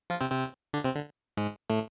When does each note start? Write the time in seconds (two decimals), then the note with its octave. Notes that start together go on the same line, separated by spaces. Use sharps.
0.10 F3 F4
0.21 C3 C4
0.31 C3 C4
0.73 D3 D4
0.84 C3 C4
0.95 D3
1.37 G#2 G#3
1.70 A2 A3